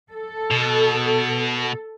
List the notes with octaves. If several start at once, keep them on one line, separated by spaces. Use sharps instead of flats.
A4
B2